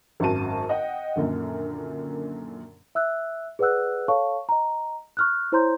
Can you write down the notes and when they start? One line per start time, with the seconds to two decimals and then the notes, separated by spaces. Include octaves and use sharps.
0.20 G#1 F#2 F#4 A5 D#7
0.69 D#5 F#5 G5
1.16 F#2 A#2 D3 D#3
2.95 E5 E6 F#6
3.59 G#4 B4 D5 F#5 E6 F#6
4.08 A4 C#5 F5 A5 C#6
4.49 D#5 A#5
5.17 C#6 F6 F#6
5.52 E4 C5 C#5 A#5 C6 G6